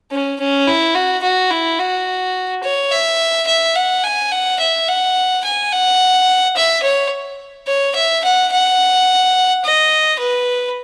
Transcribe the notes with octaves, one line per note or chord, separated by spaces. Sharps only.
C#4
C#4
E4
F#4
F#4
E4
F#4
C#5
E5
E5
F#5
G#5
F#5
E5
F#5
G#5
F#5
E5
C#5
C#5
E5
F#5
F#5
D#5
B4